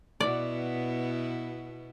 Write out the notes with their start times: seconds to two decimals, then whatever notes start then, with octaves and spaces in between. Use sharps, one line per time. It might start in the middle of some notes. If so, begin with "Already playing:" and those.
0.20 B2 B3 E4 D5